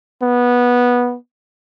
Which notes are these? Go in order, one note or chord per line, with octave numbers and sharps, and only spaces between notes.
B3